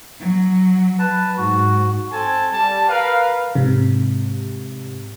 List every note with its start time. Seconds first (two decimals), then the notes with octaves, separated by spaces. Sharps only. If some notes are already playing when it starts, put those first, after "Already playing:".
0.20 F#3
0.99 B4 A5
1.37 G#2 F#4
2.12 C4 A4 G#5 A5
2.52 G3 A5
2.89 A#4 B4 F5
3.55 G#2 C3